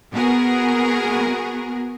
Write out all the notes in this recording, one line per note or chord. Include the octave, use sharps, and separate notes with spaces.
B3 F#4 G#4 A#4